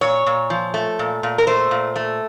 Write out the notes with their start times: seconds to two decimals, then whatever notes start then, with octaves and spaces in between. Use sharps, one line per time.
0.01 A#2 C#5
0.26 A#2
0.50 F3
0.74 A3
0.99 A#2
1.23 A#2
1.38 A#4
1.47 A3 C5
1.71 A#2
1.96 A3